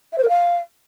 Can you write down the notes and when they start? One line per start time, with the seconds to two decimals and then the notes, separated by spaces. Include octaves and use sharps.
0.13 E5
0.18 C5
0.23 A#4
0.29 F5